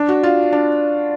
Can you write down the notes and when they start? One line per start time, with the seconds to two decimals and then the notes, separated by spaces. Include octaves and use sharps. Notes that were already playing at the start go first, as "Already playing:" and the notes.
Already playing: D4
0.09 F#4
0.23 F4
0.52 D4